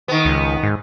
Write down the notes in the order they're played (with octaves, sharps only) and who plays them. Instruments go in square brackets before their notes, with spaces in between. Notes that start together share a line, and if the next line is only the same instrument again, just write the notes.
[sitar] D#3 B3
[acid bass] C#2
G#2